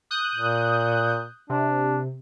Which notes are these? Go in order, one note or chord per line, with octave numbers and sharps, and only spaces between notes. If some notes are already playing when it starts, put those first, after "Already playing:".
D#6 F#6 G6
A#2
C3 D4